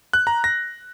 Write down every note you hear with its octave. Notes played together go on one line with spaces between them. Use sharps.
F#6
A#5
A#6